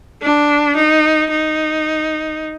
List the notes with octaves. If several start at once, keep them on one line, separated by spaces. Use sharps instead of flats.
D4
D#4
D#4